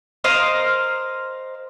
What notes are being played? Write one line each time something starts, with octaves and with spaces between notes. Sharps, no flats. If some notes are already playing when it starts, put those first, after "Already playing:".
A#4 C5 D#5 F5